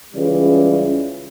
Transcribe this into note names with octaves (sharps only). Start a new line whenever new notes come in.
C#2 C#3 E3 G3